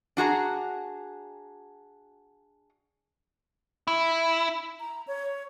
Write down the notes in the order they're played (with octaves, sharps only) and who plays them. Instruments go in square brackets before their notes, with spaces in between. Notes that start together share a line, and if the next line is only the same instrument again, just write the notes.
[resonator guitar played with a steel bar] D4 F#4 G#4 A#5
[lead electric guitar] E4
[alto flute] A#5
C#5